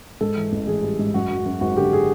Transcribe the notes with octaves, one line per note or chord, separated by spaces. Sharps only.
G#2 A4
E3
A1
E3 G#4
G3
G#2
F#2 F#4
F#2
F#2
G#1 F#4
D3 G4
G#4